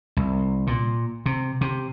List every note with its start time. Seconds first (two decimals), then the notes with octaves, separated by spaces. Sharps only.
0.17 C2
0.67 A#2
1.26 C3
1.61 C3